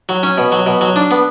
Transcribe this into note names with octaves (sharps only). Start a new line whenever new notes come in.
F#3
C#4
B2
F#3
B2
F#3
D4
B3